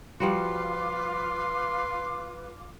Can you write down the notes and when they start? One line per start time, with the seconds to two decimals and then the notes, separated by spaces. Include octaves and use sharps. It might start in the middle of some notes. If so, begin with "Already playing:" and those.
0.20 F3 G3 F4 F#4 B4 C6 D6